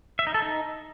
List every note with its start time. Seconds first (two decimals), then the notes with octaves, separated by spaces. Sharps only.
0.19 E5
0.27 D#4
0.34 A4
0.42 D#4